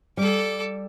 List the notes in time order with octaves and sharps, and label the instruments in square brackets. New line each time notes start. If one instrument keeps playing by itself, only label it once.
[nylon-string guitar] G3 [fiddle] A4 D6